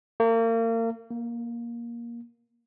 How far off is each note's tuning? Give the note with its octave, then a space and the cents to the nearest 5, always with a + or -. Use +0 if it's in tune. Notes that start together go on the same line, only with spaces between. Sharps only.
A#3 -35
A#3 +15